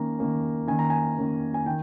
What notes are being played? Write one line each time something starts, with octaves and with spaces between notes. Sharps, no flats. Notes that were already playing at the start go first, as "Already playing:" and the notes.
Already playing: D#3 A#3 C#4 A#5
D#3 A#3 C#4
D#3 A#3 C#4 G#5
A#5
G#5
D#3 A#3 C#4
G#5
D#3 G5